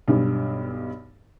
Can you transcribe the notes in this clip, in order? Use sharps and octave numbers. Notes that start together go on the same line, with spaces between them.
B1 G2